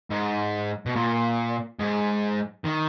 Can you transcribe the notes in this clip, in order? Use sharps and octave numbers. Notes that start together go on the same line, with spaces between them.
G#2
B2
A#2
G#2
D#3